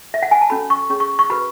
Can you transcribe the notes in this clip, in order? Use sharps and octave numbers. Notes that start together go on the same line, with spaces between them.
E5
F#5
G#5
A5
C#4 F#4 A4 B5
C#6
C#4 G#4 C#5 C#6
C#6
C#6
F#4 B4 B5